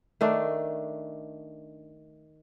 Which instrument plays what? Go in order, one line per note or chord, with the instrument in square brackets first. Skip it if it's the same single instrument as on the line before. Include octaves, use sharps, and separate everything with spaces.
[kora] D#3 A3 D4